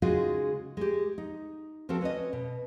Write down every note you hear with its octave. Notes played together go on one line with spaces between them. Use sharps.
C#3 G#3 D#4 F4 F#4 G#4
G#3 G4
D#4
F3 C4 F#4 A4 A#4
C#4 B4 C#5 D#5
B2